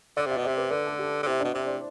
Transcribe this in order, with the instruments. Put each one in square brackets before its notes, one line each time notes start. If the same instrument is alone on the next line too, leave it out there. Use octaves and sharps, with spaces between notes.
[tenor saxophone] D3 [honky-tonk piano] D5
[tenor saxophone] C3 [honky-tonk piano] E5
[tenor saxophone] B2
[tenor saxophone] C3 [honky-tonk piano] D5
[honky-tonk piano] B4
[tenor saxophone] D3 [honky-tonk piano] B4
[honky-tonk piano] A4
G4
[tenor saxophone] D3
[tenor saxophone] C3 [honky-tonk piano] E4
[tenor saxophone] B2 [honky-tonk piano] D4
[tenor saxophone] C3 [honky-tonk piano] C5
[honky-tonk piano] D5